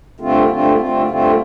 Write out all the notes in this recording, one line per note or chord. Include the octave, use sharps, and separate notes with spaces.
G2 D3 A3 C4 F4
G2 D3 A3 C4 F4
G2 D3 A3 C4 F4
G2 D3 A3 C4 F4